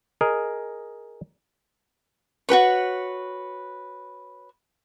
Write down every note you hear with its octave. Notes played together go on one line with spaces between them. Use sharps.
G#4 A#4 D#5
F#4 G4 B4 C#5